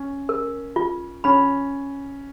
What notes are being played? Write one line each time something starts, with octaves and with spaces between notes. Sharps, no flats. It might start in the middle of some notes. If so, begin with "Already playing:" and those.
Already playing: C#4
A#4
F4
C#4 B5